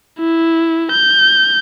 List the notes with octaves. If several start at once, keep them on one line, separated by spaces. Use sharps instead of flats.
E4
G6